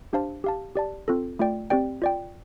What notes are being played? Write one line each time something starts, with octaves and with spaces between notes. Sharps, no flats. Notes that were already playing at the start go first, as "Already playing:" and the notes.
D4 G4 C5 F5 A5
G4 F5 A5
G4 D5 A5
C4 F4 A4
A3 F4 D5 G5
C4 G4 D5 G5
F4 D5 G5